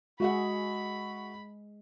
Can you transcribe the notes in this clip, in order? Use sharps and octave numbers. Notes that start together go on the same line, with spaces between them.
G#3 F#4 G#4 E5 F#5 B5